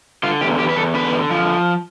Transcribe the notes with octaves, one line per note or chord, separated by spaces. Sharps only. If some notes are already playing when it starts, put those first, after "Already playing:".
D3 F4
E2 G4
E2 G4
B4
E2 A4
D3 B4
D3
F3